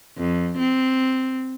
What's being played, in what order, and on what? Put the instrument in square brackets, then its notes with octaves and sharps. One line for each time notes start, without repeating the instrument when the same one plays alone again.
[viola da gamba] F2
C4